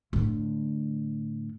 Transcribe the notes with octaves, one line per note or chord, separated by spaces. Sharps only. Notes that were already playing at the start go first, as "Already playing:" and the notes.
A2 D3